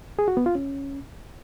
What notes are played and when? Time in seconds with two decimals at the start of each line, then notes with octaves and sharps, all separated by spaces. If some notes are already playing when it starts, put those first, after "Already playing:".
0.19 G#4
0.28 F#4
0.37 B3
0.46 F4
0.55 C#4